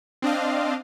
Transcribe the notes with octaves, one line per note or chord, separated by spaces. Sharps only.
C4 D4 D#5 F5